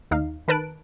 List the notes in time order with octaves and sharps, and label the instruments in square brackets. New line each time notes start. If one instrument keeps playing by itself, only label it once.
[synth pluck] D#2 D#4 F5
D#3 A#4 B4 A5 F#6 D7